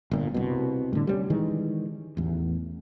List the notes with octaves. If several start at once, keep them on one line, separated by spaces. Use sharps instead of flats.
G1 A#2
C2 B2
A2 D3
G3 B3 C#4
D#3 E3 G#3
A1 E2